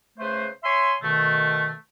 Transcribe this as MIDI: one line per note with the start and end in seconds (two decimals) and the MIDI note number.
0.19 0.46 49
0.19 0.46 57
0.19 0.46 71
0.19 0.46 72
0.63 0.93 73
0.63 0.93 76
0.63 0.93 80
0.63 0.93 84
1.02 1.72 47
1.02 1.72 51
1.02 1.72 57